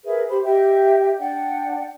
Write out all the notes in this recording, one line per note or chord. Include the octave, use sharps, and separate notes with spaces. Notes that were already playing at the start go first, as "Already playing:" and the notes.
G#4 A#4 B4 E5
G4 C5 B5
G4 D#5 E5 G5
D4 D5 F#5 G5